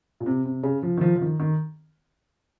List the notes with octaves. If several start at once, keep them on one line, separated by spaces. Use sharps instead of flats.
A#2
C3
C3
C#3
F3
D#3
F3
F3
D#3
D#3